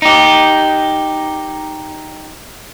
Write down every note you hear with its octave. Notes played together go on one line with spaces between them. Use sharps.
D#4 G4